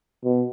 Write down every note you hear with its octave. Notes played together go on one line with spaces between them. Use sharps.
B2